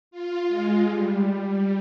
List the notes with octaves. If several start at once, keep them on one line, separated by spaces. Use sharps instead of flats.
F4
G#3
G3